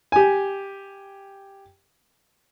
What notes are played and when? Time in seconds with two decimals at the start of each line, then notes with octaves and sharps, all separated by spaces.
0.12 G4 G#5